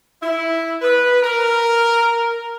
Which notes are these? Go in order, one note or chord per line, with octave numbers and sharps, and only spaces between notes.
E4
B4
A#4